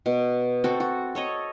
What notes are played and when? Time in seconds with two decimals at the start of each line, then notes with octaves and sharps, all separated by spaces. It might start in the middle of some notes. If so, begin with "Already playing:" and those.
0.06 B2
0.64 C4 F#4 A4
0.80 F#4
1.15 A4 C#5 D#5